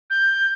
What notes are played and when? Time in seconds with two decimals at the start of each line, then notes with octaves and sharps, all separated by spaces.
0.10 G6